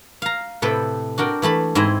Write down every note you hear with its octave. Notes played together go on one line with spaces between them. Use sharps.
F5 A#5
A2 C3 A4 B4 G5
D4 F#4 A#4 G5
E3 A3 A5 B5
G#2 C4 E4 G#4 D#5